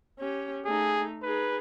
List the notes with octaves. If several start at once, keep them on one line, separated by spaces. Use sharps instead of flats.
C#4 G4
A3 D#4 G#4
D#4 G#4 B4